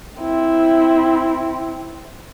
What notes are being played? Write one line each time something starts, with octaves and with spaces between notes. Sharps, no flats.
C4 E4